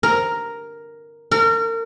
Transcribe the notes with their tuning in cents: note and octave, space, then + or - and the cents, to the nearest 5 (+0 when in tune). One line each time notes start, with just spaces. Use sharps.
A#4 +0
A#4 -35